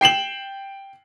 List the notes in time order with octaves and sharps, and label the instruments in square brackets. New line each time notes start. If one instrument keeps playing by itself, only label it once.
[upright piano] G5 C7 E7 F#7